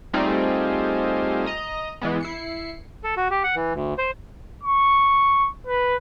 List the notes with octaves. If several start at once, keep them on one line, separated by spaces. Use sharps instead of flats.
G3 A3 C4 D#4 F4 G#4
D#5 A#5
E3 G#3 B3
E4 C7 C#7
A4
F#4
G4
F#5
E3
D2
C5
C#6
B4